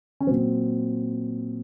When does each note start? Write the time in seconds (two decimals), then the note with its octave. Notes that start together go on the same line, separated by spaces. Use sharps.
0.20 C#4
0.27 A#2 F#3 C4